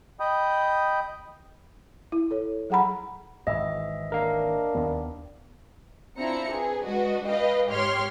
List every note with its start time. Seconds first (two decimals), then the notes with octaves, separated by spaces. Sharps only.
0.20 D#5 G5 B5 D#6 G6
2.12 E4
2.31 A4 C#5
2.70 F#3 G#4 F#5 A#5 B5
3.47 G#1 G#2 E3 D#5 E5
4.12 D4 A#4 F5
4.75 D#2 D#3 B3
6.18 C4 D4 E4 F4 A#5 C#7
6.51 G#4 B4
6.83 G#3 D4 F#4 B4 D#5
7.26 B4 D#5 F5 G5
7.69 G#2 G4 C#5 C6 F6